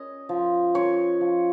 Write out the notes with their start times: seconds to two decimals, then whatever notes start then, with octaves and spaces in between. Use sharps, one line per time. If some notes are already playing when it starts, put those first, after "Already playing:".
Already playing: C#4 D#5
0.29 F3
0.74 C#4 C#5
1.21 F3